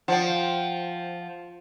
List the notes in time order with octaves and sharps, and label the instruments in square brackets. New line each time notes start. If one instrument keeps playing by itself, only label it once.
[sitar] F3 [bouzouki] F#5 G5